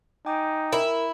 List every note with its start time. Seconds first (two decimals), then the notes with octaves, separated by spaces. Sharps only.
0.26 D#4 G5 G#5 D6
0.72 E4 A#4